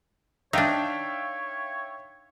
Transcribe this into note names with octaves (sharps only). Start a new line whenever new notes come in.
D4 D#4 C#5 E5 F5 G5